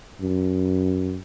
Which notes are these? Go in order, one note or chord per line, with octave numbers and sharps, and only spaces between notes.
F#2